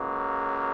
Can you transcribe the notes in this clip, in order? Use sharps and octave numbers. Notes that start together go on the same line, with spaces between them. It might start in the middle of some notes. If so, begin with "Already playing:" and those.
Already playing: C#2 C#3 F#3 A#3